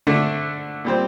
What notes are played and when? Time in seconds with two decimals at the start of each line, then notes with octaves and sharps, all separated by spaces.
0.07 D3 A3 D4
0.85 A#2 G3 C4